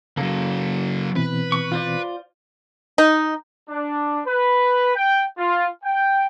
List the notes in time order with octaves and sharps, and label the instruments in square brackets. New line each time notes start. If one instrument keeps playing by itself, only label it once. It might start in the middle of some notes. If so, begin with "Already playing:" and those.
[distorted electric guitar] C#3 F#3 [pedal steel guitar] A#3 A4
[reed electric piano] B2 E3 C4 [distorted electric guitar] B4
[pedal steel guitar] C#6
F4 C5 D5
[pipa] D#4
[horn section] D4
B4
G5
F4
G5